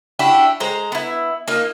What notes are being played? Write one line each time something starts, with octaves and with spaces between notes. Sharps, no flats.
D4 E4 F#4 G4
G#3 C5 A#5
B3 E4
A#3 D#4 F4